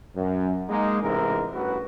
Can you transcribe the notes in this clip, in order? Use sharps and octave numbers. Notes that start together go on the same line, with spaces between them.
F#2
G#3 A#3 D#4
A1 G#2 C3 E3 G#3 A#4
A1 G2 F#4 B4